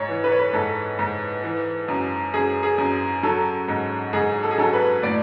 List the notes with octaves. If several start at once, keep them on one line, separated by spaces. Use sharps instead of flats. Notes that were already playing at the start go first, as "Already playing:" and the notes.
Already playing: G#2 C#5
E3
B4
C#5
B4
G#2 A4
G#2
E3
F#2
F#2 G#4
G#4
F#2
F#3 A4
G#2
G#2 G#4
A4
G#4
F#3 A4
B4
A2 D5